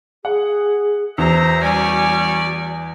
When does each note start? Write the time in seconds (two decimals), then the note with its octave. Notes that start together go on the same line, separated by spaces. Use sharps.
0.25 G#4 F#5
1.18 E2 F#4 C5 E5 A#5
1.62 G3 C#4 D5 G#5